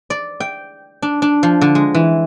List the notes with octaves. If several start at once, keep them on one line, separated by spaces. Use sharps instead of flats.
D5
G5
D4
D4
F3
D3
G#3
E3